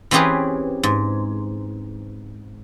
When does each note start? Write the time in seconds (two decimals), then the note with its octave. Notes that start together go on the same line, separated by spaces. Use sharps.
0.11 E3 C4 C#4 G4 G#4 B4
0.83 G#2